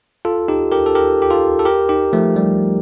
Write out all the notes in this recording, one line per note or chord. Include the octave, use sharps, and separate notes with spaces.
F4 A4
D#4 G4
G4 A#4
A4
G4 A#4
G4
F4 A4
A4
G4 A#4
D#4 G4
F3 A3
G3